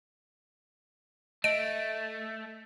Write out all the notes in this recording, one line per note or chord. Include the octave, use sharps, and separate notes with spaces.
A3 D#5 D7